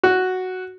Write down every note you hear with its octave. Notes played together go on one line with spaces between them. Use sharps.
F#4